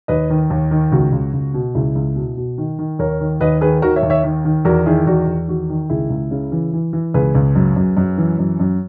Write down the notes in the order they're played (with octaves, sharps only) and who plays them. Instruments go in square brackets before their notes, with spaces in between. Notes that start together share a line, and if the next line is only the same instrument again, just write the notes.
[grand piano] D#2 B4 D#5
D#3
D#2
D#3
C#2 F#4
C#2
C#2
B2
C#2 E4 G#4
C#2
B2
B2
D#3
D#3
D#2 A#4 C#5
D#3
D#2 B4 D#5
D#3 G#4 B4
D#3 F#4 A#4
C#5 E5
D#2
C#5 E5
D#3
D#3
E2 F#4 A#4
D#3 E4 G#4
E2 F#4
E2
D#3 F#4
D#3
C#2 E4 G#4
C#2
C#3
E3
E3
E3
C#2 G#4 B4
C#2
F#2
F#2
F#2
E3
F#2
F#2